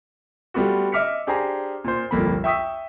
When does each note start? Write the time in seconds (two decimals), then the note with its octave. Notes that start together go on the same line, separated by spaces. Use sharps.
0.54 G3 A3 B3 F4 F#4
0.92 D#5 E5 D6 F6 B6 C#7
1.27 D4 G4 G#4 C5 G#5 A#5
1.84 A#2 C5
2.11 G1 C2 F2 A#3 A4 B5
2.44 E5 G5 C#6 D#6 E6 B6